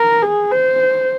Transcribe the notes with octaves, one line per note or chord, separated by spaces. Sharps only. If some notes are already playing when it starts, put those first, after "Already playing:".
Already playing: A#4
G#4
C5